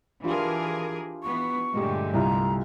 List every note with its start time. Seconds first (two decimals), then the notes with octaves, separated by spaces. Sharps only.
0.24 E3 D4 F4 G4 G#4 A#4
1.23 E3 B3 C#6
1.74 G2 A#2 D3 G#3 A3 G4
2.14 C2 E4 F4 A#5